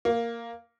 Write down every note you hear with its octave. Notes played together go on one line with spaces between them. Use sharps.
A#3